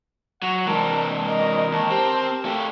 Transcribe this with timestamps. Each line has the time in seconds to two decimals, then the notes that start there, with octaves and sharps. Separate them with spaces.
0.42 F#3 F#5 A#6
0.67 C3 E3 G#3 A#4 A5
1.26 A#4 D#5
1.72 D#2 A5
1.90 C4 G4
2.45 A3 G4 F5